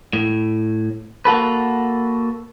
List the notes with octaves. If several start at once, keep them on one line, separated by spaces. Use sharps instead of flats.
A2
A#3 F#4 A4 B4